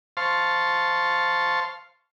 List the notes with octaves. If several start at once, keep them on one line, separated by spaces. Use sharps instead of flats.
C5 F5 A5 C6 C#6